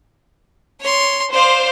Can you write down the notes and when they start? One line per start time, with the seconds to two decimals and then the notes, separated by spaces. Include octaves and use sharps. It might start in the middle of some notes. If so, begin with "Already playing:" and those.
0.81 C#5 C6
1.33 C5 D5 F5